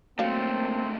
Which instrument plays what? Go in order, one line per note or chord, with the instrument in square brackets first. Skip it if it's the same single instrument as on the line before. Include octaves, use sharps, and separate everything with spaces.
[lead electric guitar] C#2 A3 [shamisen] F#3 F5 [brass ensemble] A#3 C4